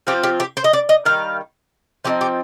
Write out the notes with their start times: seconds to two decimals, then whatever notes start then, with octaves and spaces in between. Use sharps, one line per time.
0.07 F3 C4 F4 G4
0.23 G4
0.40 G4
0.57 C5
0.64 D#5
0.73 D5
0.89 D#5
1.05 D#3 G3 F5
2.05 F3 C4 D#4 G4
2.21 G4